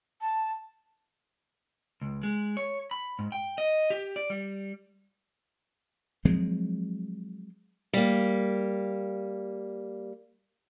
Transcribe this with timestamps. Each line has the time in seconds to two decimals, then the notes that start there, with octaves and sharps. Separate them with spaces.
0.21 A5
2.02 C#2
2.23 G#3
2.57 C#5
2.91 B5
3.19 G#2
3.32 G5
3.58 D#5
3.90 G4
4.16 D5
4.30 G3
6.25 F3 F#3 G#3 C4
7.93 G3 A#3